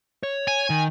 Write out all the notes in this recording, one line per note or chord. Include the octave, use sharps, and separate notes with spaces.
C#5
G#5
D#3